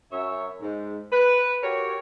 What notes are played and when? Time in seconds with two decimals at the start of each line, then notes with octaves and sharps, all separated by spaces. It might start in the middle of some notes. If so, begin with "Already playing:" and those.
0.12 F#2 C#5 E5
0.62 G#2
1.12 B4
1.63 F#4 G4 A#4 C#5